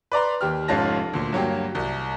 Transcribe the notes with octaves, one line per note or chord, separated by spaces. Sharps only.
B4 D5 A#5 C6
D#2 G4 F6
F1 G#2 C#4 F4 A5 A#6
D2 A#2
G2 F#3 A#3 G4
C2